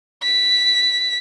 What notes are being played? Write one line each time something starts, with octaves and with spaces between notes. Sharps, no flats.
B6